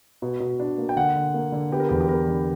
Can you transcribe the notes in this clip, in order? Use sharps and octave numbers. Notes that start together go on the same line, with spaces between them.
B2
B2
D4
A#3
G5
D3 F#5
D3
A#3
D3
B3 G4
A#4
E2 G4
G4
B3 A#4
D3